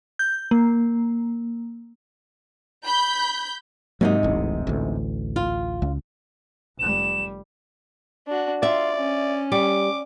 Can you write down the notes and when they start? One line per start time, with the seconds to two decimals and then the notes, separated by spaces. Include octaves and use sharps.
0.19 G6
0.51 A#3
2.84 B5 G6
4.01 G#2 C3 F#3 A#3 D#4
4.23 D1 A1
4.67 A1 D2
5.36 F4
5.82 C#2
6.79 F1 G3 E7
8.27 D4 F#4
8.63 F4 D5 E5
8.96 C#4
9.52 G3 D6